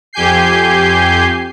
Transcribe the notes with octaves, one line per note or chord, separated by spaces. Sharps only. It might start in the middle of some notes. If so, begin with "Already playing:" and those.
F2 G4 G#5 G6 C7